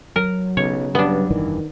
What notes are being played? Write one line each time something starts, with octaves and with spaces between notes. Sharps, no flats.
F#3 A#4
B1 C#3 C#5
G2 B3 D4
F1 G2 D#3 E3